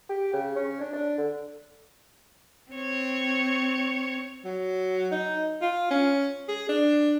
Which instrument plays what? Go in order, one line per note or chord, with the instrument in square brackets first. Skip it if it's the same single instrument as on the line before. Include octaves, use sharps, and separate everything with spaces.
[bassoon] G4
C#3
C#4
D4
D4
D3
[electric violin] C4 C#5
[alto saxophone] F#3
D#4
F4
C#4
G#4
D4